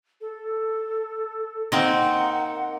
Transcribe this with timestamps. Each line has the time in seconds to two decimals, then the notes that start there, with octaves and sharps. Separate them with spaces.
0.21 A4
1.72 A#3 C4 D#4 F#5